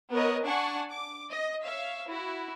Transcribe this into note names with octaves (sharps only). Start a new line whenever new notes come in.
B3 A#4 C#5 D#5
D4 F#5 G#5 A5 C#6
D6
D#5
C#5 E5 F5
E4 F#4